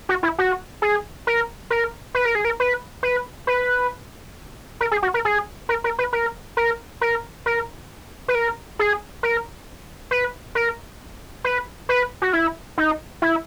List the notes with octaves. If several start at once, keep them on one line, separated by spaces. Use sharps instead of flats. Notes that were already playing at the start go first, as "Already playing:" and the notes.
F#4
E4
F#4
G#4
A#4
A#4
B4
A#4
G#4
A#4
B4
B4
B4
A#4
G#4
F#4
A#4
G#4
A#4
A#4
B4
A#4
A#4
A#4
A#4
B4
A#4
G#4
A#4
B4
A#4
B4
B4
F#4
E4
D#4
E4